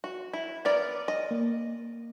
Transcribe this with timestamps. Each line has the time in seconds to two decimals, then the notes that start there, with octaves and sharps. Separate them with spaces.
0.04 F#4
0.33 E4
0.65 B3 A#4 D5
1.08 D#5
1.31 A#3